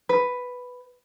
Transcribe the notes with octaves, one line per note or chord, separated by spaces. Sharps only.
B4